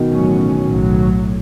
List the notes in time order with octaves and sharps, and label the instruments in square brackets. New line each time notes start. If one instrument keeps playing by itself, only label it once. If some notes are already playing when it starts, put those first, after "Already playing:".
Already playing: [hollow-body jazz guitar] B2 D#3
[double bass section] A1 A2 F#3 C#4
B1 A2 F#3